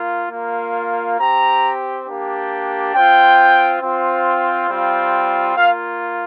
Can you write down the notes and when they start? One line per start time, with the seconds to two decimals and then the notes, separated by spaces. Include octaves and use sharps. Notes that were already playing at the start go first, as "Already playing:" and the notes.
Already playing: A#3 F4
0.31 A#3 F4
1.19 C4 G4 A#5
2.07 A#3 D4 G4
2.94 C4 F4 G5
3.81 C4 F4
4.69 G3 C4 F4
5.57 A#3 F4 F5